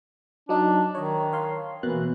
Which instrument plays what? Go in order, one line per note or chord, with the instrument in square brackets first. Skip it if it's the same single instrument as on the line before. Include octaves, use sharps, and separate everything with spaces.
[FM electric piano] F#3 D#4 D5 [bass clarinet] D4
[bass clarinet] D#3 [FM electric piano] C#5 D#5
[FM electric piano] C#5 F5 C6
[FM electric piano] B2 A#3 F#6 [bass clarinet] E3